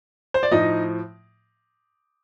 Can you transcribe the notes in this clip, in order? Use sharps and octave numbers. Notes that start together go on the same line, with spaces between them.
C5
D5
A2 F3 D#4 D#5